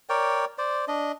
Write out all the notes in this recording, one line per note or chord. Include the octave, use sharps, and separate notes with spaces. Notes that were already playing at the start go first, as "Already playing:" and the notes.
A#4 C#5 D5 G5
C5 D5
D4 D#5